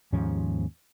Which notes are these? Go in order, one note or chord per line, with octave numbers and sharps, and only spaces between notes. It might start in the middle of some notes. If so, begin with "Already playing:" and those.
D#2 G#2 F3 C#4